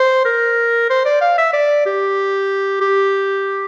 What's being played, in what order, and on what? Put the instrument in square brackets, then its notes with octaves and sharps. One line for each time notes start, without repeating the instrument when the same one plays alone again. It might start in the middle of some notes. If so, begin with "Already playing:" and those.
Already playing: [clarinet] C5
A#4
C5
D5
F5
E5
D5
G4
G4